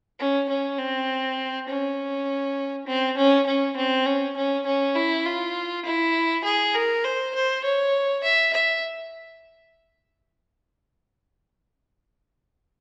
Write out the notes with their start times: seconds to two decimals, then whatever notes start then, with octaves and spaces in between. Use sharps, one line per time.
0.19 C#4
0.49 C#4
0.78 C4
1.68 C#4
2.87 C4
3.18 C#4
3.47 C#4
3.76 C4
4.06 C#4
4.37 C#4
4.66 C#4
4.96 E4
5.26 F4
5.85 E4
6.44 G#4
6.74 A#4
7.04 C5
7.34 C5
7.64 C#5
8.23 E5
8.53 E5